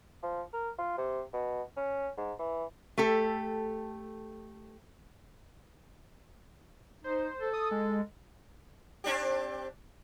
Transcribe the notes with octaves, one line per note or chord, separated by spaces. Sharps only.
F3
A#4
F4
C3
B2
C#4
G#2
E3
A3 G4 A4
D#4 C5
A4
D#6
G#3
C4 D4 G4